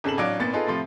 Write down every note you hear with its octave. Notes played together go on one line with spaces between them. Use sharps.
G#1 C#3 A4 E7 F#7
A1 F#3 D4 F5 D6 D7
G#1 A#2 B3 A6
D#4 F4 G#4 A4 B4
A2 C3 F3 F4